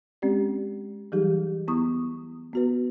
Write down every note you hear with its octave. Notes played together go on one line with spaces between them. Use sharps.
G#3 C4 C#4 G4 D5
E3 F#3 G3 D#4 G4 G#4
B3 E4 C#6 D#6
B3 F#4 B4